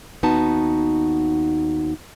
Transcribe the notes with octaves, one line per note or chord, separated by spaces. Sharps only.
D#2 B3 D#4 F#4 A5